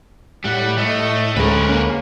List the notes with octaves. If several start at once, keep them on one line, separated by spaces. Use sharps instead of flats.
A2 G3 F#5
A3 D#5
D2 G#3 C#4 A#4 B4
A#3 C#4